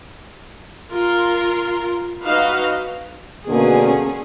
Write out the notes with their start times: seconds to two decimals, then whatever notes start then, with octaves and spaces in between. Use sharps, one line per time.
0.92 F4 A#4 C6
2.23 D#4 F#4 B4 D#5 F5
3.48 B2 D3 A#3 C#4 G#4